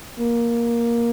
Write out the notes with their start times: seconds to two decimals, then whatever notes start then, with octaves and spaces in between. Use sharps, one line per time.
0.19 A#3